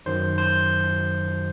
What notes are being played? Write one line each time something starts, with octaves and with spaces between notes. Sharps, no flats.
F#2 D#3 F#3 C5
C5